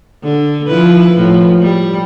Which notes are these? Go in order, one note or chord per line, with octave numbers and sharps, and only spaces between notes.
D3
F3 E4 B4
A2 F3
G3